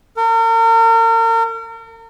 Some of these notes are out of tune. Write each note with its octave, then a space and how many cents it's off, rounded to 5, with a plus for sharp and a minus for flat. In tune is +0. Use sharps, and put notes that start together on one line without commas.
A#4 -40